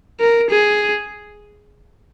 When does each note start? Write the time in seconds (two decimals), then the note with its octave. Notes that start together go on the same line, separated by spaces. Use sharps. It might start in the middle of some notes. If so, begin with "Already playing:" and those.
0.20 A#4
0.50 G#4